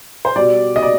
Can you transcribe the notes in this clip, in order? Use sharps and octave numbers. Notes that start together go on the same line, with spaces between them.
C5
B2 G3 D5
D#5
D5